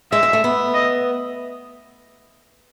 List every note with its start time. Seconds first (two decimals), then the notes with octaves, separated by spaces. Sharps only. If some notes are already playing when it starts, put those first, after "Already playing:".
0.12 G#3 E5
0.23 G#3
0.33 A3
0.44 B3
0.74 D#5